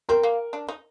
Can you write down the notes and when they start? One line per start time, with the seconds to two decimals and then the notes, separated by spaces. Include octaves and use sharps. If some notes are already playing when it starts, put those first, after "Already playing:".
0.09 C4 A#4
0.23 A#3
0.53 D4
0.68 D#4